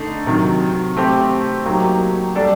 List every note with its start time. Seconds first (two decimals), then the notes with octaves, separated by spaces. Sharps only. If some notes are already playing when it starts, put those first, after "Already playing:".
Already playing: D3 A3 D#4
0.26 C3 D#3 F#3
0.97 A3 C4 G4
1.65 F#3 A#3 D#4 G4
2.36 G3 D4 A4 D5